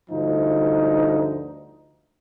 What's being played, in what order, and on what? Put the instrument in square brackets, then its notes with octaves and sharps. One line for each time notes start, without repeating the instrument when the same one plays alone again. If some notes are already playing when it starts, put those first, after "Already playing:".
[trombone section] D2 G2 F3 D#4